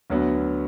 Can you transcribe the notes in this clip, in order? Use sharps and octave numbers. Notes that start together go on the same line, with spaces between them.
D2 D3 F#3 B3